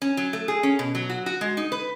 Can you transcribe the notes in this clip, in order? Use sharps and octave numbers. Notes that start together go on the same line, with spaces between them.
C#4
F#3
A3
G#4
C#4
B2
F#3
F#4
F#4
G#3
D#4
B4